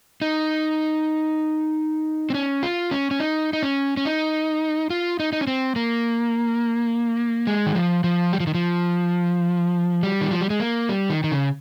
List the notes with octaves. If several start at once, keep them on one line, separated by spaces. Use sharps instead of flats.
D#4
C4
C#4
F4
C#4
C#4
D#4
D#4
C#4
C#4
D#4
F4
D#4
D#4
C#4
C4
A#3
G#3
D#3
F3
F3
G3
F3
D#3
F3
G3
D#3
F3
G3
G#3
A#3
G3
D#3
D#3
C#3